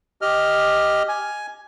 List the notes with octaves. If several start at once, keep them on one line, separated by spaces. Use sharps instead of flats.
G4 D#5 F6
G#5